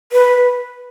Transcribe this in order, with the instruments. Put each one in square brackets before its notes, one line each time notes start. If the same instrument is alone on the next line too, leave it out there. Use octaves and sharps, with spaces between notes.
[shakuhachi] B4